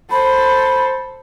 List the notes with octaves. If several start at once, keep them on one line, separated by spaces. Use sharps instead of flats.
A4 C5 B5